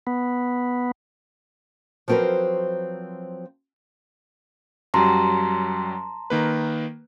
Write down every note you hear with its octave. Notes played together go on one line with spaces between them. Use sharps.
B3
F3 F#3 C4 F#4 A#4 B4
F#2 F#3 G3 A5 A#5 C6
D#3 A#3 B4